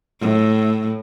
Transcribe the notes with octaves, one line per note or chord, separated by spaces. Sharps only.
A2